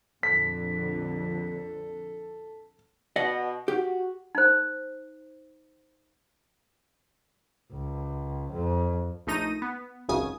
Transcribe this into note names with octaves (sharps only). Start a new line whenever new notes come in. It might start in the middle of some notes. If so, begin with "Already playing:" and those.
A#1 F2 D3 A4 B6
B2 D5 D#5 F#5
F#4 G4
D#4 C5
C#2
F2
A#1 A3 D#4 A#6 D#7
B3
G#1 C#2 F#2 C#3 G#5 D#6